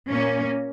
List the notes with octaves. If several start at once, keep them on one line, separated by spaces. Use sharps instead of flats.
A#2 A#3 C#4